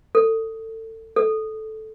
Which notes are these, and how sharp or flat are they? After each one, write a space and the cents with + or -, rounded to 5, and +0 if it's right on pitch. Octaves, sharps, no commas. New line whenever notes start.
A4 +25
A4 -10